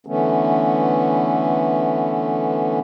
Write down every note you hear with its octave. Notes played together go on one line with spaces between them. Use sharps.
D3 E3 A3 B3 C#4